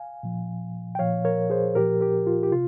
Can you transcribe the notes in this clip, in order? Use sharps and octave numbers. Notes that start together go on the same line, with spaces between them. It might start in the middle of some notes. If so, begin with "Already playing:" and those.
Already playing: F5 G#5
A#2 F3
G5
A#2 F3 C#5 F5
A#4 C#5
G#4 C5
A#2 F3 G4 A#4
G4 A#4
F4
G4
C3 F4